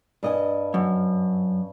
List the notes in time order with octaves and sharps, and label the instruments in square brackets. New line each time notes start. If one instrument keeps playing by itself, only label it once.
[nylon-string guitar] G2 D#5 G#5
[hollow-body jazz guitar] F#2